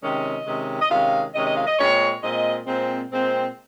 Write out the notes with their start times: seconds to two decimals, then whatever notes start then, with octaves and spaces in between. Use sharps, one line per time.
0.02 C3 D#3 G#3 C#4 D#5
0.46 C3 D#3 G#3 C#4
0.81 D#5
0.90 C3 D#3 G#3 C#4 F5
1.34 C3 D#3 G#3 C#4 D#5
1.46 D#5
1.56 F5
1.67 D#5
1.78 A#2 G#3 C4 C#5
2.23 A#2 G#3 C4 D#5
2.67 A#2 G#3 C4
3.11 A#2 G#3 C4